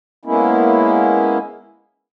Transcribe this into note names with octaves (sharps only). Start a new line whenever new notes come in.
G#3 A#3 B3 C#4 E4